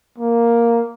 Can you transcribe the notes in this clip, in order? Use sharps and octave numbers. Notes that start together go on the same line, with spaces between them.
A#3